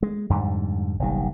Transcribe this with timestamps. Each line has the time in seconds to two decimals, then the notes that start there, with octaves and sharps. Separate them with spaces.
0.03 G#3
0.30 F2 G#2 D3 G3
1.00 F#1 B1 D#3 G3